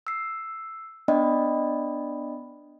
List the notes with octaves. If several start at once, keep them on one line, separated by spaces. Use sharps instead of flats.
E6 C7
B3 D4 D5 D#5 G5 B5